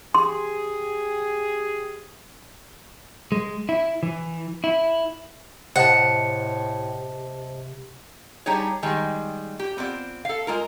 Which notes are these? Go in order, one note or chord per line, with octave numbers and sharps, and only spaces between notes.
G4 G#4 C6
G#3
E4
E3
E4
A2 C3 C5 D#5 F#5 A5
G3 D4 D#4 G4 G#4 C#5
D#3 G3 G#3
G4
B3 C4 F4 D5
A4 F5
G#3 F4 A#4